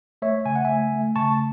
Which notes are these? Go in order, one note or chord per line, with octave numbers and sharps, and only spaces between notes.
A3 C#5 E5
C#3 G#5
F#5
A3 E5 G#5
A3
C#3 A5 C#6